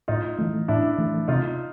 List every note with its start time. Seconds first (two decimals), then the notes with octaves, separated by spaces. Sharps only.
0.08 A2 D#4 F4
0.39 E3 A3
0.68 A2 D4 E4
0.98 E3 A3
1.28 C3 D#4 F4